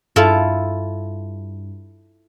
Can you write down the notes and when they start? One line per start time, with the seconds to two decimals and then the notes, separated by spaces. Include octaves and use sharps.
0.16 G2 E4 F4 A4